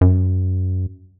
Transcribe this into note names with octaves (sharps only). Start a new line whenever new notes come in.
F#2